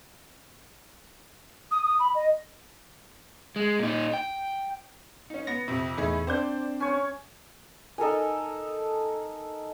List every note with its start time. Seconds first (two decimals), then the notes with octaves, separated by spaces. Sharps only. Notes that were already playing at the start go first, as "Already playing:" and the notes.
1.71 D#6
1.84 D#6
1.99 B5
2.15 D#5
3.56 G#3
3.79 A#2 D#4
4.13 G5
5.30 C#4 D#4
5.47 B3 A#6
5.68 F2 C3
5.98 E2 A2 D#4 G#4 E5 B5
6.27 C4 D4 C5 D5 G6
6.80 C#4 C#5
7.98 D#4 A4 A#4 G#5